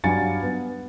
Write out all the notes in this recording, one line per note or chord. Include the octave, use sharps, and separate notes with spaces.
G2 F#3 F5 G#5 A6 C#7
B3